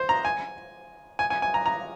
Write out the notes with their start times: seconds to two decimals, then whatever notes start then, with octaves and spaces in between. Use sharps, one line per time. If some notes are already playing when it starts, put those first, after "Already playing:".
Already playing: C5
0.09 A#5
0.25 G#5
1.19 G#5
1.30 G#5
1.42 G#5
1.54 A#5
1.66 A#5